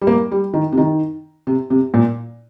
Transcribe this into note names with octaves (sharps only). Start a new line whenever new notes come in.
G3
A#3
G3
D#3
C3
D#3
C3
C3
A#2